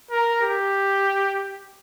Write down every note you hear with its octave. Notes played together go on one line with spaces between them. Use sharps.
A#4
G4